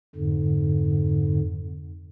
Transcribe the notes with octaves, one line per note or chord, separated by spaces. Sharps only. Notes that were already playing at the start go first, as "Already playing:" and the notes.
F2 G#2 D3